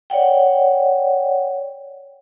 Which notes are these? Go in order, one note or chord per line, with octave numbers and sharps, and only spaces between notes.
C#5 D5 F#5 G5